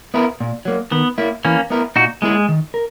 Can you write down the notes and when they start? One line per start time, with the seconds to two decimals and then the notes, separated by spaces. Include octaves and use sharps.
0.14 B3 E4 A#4
0.40 A#2
0.65 F#3 A#3
0.91 D#3 B3
1.18 A#3 E4
1.45 E3 A#3 C#4
1.70 B3 E4 A#4
1.96 A#2 D#4 F#4
2.22 G#3 A#3 E4 G#4
2.49 D#3
2.74 A#4